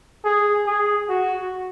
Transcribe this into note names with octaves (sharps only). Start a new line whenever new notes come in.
G#4
G#4
F#4